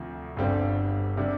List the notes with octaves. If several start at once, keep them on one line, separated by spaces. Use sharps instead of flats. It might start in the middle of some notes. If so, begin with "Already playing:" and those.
Already playing: D2 C3 F3
G1 G2 D3 G3 C4
C3 G3 D4